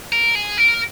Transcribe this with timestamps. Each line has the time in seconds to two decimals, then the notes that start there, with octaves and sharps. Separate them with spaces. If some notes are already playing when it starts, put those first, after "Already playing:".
0.12 A#4
0.35 G#4
0.58 A#4